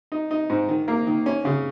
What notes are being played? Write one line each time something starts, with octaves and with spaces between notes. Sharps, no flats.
D#4
D#4
G#2
D#3
A#3
D#3
C#4
C#3